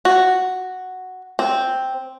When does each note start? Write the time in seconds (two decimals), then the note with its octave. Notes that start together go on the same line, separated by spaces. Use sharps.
0.05 F#4
1.39 C4